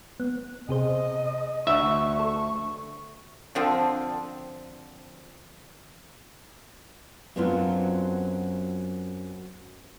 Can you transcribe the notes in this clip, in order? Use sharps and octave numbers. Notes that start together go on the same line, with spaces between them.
B3
C3 G#4 C5 D#5
D2 E5 C#6
A4 C#6
D3 F3 C4
F#2 F#3 B3 C4 D4 F4